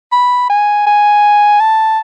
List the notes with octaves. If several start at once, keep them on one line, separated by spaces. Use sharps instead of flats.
B5
G#5
G#5
A5